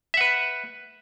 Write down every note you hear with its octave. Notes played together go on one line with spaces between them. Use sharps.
B4 E5 F#5